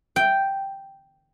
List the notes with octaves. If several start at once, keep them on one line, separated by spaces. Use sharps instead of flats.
G5